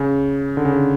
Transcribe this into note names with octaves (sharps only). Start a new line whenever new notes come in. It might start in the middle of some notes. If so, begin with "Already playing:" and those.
Already playing: C#3
D3
C#3
D3